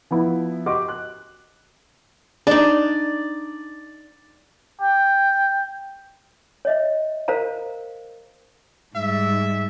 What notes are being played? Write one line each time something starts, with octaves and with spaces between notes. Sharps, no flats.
F3 B3 E4
F#4 G4 D#5 C6 D6
F#6
D4 D#4 D5
G5
C#5 D#5 E5
A#4 C5 F5 A#5
G#2 G3 E5